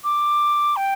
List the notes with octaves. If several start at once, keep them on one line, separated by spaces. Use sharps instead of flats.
D6
G5